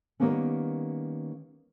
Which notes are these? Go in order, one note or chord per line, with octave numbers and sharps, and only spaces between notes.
D#3 E3 G3 A#3 B3 C#4